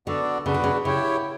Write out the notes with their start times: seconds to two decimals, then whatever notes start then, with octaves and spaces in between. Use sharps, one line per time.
0.07 D3 B3 D4 F#4 A4 D5
0.46 C#3 B3 D4 F#4 B4
0.54 D3
0.64 C#3
0.85 C#3 E4 G4 C#5 G5